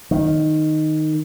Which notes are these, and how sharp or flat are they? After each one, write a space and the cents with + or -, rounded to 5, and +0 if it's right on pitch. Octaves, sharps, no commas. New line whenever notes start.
D#3 -5